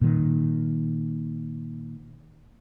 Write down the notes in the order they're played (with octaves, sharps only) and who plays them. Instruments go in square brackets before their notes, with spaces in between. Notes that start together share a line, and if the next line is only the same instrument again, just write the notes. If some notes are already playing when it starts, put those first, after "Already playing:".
[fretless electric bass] A#2 D#3